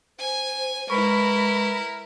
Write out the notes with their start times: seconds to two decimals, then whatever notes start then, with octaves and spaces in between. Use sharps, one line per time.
0.19 C5 G#5
0.90 G#3 E4 A#4 B4 B5 C#6